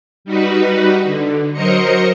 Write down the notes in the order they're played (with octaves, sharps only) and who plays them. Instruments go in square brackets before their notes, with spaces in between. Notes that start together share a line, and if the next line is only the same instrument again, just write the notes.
[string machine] G3 D#4 F#4 B4
D3
F#3 A#4 C5 D#5 C#7